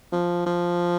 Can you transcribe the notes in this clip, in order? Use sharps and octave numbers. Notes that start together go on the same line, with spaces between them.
F3
F3